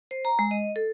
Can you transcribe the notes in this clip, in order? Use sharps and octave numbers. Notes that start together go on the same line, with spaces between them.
C5
A#5
G#3
D#5
A4